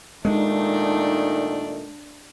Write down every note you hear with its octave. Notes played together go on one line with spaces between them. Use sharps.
A#2 D#3 G#3 A3 D4 D#4